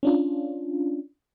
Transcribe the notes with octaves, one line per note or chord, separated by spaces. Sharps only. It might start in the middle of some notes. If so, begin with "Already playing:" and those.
C#4 D4 F4